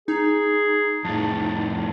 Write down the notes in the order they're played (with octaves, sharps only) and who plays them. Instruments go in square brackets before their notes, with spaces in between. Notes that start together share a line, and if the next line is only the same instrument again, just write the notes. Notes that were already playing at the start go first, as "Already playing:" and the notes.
[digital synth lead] D#4 [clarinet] G#4
[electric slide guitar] F2 A2 [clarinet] A5